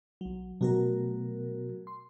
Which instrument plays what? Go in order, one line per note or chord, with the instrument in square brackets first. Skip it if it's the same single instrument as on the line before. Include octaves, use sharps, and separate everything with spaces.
[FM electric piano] B1 F#3
[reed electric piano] B2 F#3 B3 [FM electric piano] A3 F#4 A#4
[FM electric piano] C6